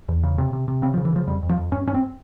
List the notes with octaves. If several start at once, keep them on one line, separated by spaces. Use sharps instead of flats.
E2
C#3
C3
C3
C3
C#3 C4
F3
C#3
E3
C#3 F3
F2 G3
F2
F3
F2
G2 C#4
G2 C#4
C4